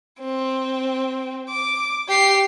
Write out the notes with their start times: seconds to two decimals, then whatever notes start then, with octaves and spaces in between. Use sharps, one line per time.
0.20 C4
1.49 D6
2.09 G4 C7